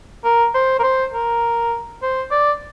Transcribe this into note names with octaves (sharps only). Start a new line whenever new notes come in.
A#4
C5
A#4
C5
A#4
C5
D5